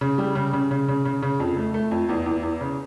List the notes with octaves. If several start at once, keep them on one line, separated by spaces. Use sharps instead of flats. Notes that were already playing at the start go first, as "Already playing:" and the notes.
C#3
G3
C#3
C#3
C#3
C#3
C#3
C#3
F2
A3
A3
F2
E2
E2
E2
C#3